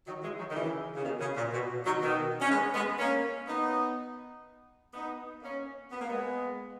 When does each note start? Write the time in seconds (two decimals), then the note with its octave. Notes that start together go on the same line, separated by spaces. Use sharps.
0.06 D#3 F#3
0.22 E3 G#3
0.38 D#3 F#3
0.50 D#3
0.55 C#3 E3
0.95 C#3
1.04 B2 D#3
1.20 C#3
1.36 A#2
1.53 B2
1.85 D#3 F#3
2.01 B2 D#3
2.41 C#4
2.50 G#3 B3
2.74 G#3 B3
2.98 A#3 C#4
3.47 B3 D#4
4.94 B3 D#4
5.42 A#3 C#4
5.91 B3
6.00 A#3
6.09 G#3 B3